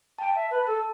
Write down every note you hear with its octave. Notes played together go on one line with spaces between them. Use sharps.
G5 A5
E5
B4 A5
A4 A5